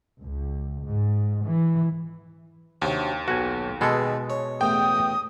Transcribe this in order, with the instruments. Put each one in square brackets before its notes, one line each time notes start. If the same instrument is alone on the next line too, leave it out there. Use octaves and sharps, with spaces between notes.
[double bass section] C#2
G#2
E3
[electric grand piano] D#2 [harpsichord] C3 F#3 D4
[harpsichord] B1 [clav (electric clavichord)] F#4 G#5
[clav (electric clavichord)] B2 G#3 A4 [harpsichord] G#4 B4
[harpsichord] C#5
[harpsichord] A1 E2 [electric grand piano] G5 [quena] D#6